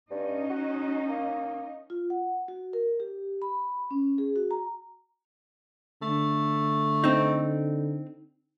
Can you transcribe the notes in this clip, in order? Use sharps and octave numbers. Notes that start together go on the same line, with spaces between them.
G2 C#4 D#4 D#5
F#4
A#3
F4
F#5
F#4
A#4
G4
B5
C#4
G#4
F#4
A#5
D3 A3
C4 D#4